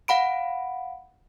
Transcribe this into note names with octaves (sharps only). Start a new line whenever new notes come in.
F5 F#5 B5 D7